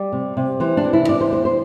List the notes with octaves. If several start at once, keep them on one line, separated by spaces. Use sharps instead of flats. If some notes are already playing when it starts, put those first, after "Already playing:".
Already playing: G3 D5
C3
C3
E3 C5
D4
E3
E4
C3 D5
C5
E2 C5
C5